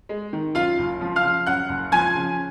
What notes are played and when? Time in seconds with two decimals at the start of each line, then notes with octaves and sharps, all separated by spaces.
0.09 G#3
0.33 D#3
0.55 F#2 F4 F5
0.78 F#1
1.01 F3
1.16 F5 F6
1.23 C#3
1.46 F#2 F#5 F#6
1.69 F#1
1.92 F3 G#5 G#6
2.15 C#3